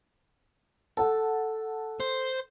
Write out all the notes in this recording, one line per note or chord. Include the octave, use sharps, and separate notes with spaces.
A4 F#5 A5
C5